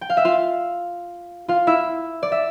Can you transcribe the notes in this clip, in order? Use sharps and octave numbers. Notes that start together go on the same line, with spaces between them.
G5
F5
E5
F4 F5
F4 F5
E4 E5
D5
E5